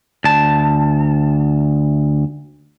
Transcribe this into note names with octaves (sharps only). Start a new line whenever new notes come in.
D2 A5